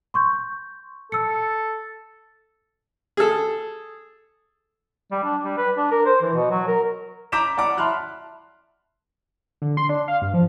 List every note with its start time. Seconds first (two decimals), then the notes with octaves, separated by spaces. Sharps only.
0.14 C6 C#6 G6
1.12 A4 E6 C#7
3.17 G#4 A4
5.11 G3
5.24 D4
5.43 G3
5.57 B4
5.77 D4
5.91 A#4
6.06 C5
6.21 E3
6.34 B2
6.51 F#3
6.67 A#4
7.32 A#5 D6 G6 B6 E7
7.57 D5 F#5 A#5 D6
7.77 E5 A5 B5 C6 F6 F#6
9.62 D3
9.77 C6
9.89 D4
10.08 F5
10.22 G2
10.34 F3